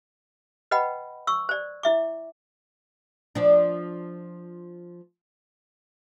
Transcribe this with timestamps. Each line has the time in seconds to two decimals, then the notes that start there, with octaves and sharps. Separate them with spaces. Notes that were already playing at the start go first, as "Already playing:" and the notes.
0.71 B4 D#5 F#5 G5 B5
1.27 C#6 E6
1.49 C5 D5
1.83 E4 E5 D6
3.35 F3 D4